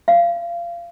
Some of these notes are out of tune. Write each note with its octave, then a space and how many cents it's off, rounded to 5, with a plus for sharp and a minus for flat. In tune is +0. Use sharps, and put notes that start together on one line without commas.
F5 -25